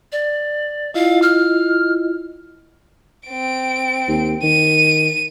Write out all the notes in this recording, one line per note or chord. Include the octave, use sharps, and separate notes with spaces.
D5
E4 F4 D#5 F5
F6
C4 D7
D#2
D#3 D#7